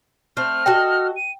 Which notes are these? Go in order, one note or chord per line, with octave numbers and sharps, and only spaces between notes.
A3 C4 F6
F#4 A4 D#5 G5
D#7